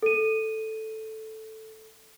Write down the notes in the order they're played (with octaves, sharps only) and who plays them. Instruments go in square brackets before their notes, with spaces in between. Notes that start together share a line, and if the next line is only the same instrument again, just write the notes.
[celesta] A4 D#7